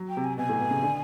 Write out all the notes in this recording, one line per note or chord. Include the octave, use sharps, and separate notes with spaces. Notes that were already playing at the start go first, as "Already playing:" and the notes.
Already playing: F#3
G5
C3
G#5
B2 G#5
A2
B2
C#3
D3